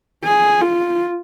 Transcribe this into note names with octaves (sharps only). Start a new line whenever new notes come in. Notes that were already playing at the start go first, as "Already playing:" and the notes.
G#4
F4